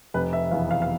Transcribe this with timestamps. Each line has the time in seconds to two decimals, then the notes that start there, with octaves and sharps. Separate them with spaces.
0.14 F1 B4
0.33 E5
0.51 E2 B2 B3 F5
0.71 F5
0.82 F5